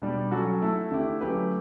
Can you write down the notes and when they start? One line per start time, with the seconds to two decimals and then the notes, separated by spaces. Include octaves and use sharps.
0.02 B2 G3 D4 G4
0.31 F#3 C#4 F#4 A4
0.62 A3 E4 A4
0.91 D3 A3 E4 G4
1.21 F#3 A3 C#4 G4 B4